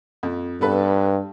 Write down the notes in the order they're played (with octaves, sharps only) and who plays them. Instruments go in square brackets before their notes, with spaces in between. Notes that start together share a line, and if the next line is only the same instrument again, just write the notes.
[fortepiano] F2
[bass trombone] G2 [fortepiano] B3 A4 B4